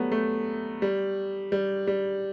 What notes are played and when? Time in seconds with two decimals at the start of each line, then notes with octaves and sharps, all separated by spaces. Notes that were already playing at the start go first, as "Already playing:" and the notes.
Already playing: F#3 G3 A3 B3
0.12 A3
0.82 G3
1.52 G3
1.87 G3